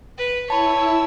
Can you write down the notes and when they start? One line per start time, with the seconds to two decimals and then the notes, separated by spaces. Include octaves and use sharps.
0.18 B4
0.50 E4 C#5 A5 B5 E6